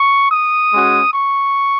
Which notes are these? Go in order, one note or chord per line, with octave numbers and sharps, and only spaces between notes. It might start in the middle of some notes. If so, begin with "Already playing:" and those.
Already playing: C#6
D#6
G#3 C#4 F#4
C#6